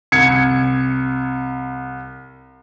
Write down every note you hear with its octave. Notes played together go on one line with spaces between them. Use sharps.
C2 G#6 C#7